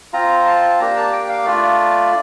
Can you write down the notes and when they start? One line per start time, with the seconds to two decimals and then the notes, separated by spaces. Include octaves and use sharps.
0.13 C4 F4 A#5
0.39 A#5
0.46 A5
0.79 A#3 D4 G4 A#5
0.97 A5
1.13 G5
1.29 F5
1.46 A3 D4 F4 D5